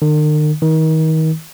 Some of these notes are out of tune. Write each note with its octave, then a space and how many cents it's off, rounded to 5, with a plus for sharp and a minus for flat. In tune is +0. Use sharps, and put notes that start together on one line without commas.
D#3 -45
D#3 +30